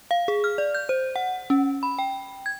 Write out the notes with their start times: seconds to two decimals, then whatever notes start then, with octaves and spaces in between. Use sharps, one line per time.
0.11 F5
0.28 G#4
0.44 F6
0.58 D5
0.75 G6
0.89 C5
1.16 F#5
1.50 C#4
1.83 B5
1.99 G5
2.46 G#6